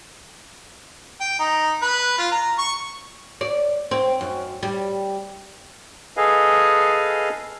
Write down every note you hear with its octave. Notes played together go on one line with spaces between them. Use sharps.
G5
D#4
B4
F4
A#5
C#6
D5
C4
F#2
G3
G#4 A4 B4 D#5 F5 G#5